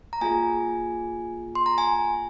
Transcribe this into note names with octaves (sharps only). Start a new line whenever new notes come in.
A#5
A#3 F4 G#4 G#5
C6
A#5
G#5